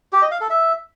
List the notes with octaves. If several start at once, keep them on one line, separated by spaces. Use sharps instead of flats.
G4
D#5
F5
A4
E5